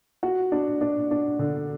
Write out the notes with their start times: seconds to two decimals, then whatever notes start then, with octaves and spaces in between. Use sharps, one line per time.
0.23 F#4
0.52 D4
0.81 D4
1.11 D4
1.39 D3